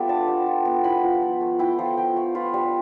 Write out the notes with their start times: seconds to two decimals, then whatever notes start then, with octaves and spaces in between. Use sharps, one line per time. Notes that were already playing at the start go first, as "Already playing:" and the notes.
Already playing: G3 B3 F4 A4 D5 E5
0.09 D4 A5
0.28 G3
0.46 F4
0.65 B3
0.84 E4 B5
1.03 F3
1.22 F3
1.41 A3
1.59 E4 G5
1.79 F3
1.97 F3 G5
2.16 A3
2.35 F4 B4
2.54 G3